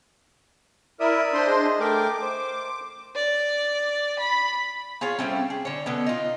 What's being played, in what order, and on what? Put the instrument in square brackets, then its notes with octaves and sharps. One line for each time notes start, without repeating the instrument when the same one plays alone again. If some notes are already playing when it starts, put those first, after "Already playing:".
[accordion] E4 A#4 [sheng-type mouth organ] D5 E5 D#6
[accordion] D4 C5 C6
[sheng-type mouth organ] G#4 D#5
[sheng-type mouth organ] A3 A#4 G5 [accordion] D6
[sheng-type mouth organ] C5
[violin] D5
B5
[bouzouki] F4 G#4 C#5 F5
G3 A3 C4 C#4
G#4
D3 C#5
B2 D3 B3 C#4
D#4 F4